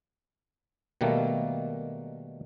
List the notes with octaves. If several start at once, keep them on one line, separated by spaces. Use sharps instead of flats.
B2 D#3 G3 A3 A#3